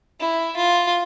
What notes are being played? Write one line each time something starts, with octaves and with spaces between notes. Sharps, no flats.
E4
F4